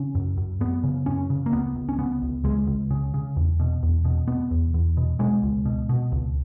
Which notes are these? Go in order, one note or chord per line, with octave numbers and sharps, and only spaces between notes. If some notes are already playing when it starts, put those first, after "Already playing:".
Already playing: C#3 C#4
F#2
F#2
F#2 B3
C#3
F#2 C#4
C#3
A#3
C#2 B3
C#2
C#4
C#3 B3
C#2
C#2 G#3
C#2
C#3
C#3
E2
B2
E2
B2
B2 B3
E2
E2
B2
B2 G#3
C#2
B2
B2
C#2